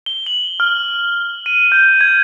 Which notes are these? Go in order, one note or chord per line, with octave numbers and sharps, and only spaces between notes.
G7
F#7
F6
D#7
G6
G#6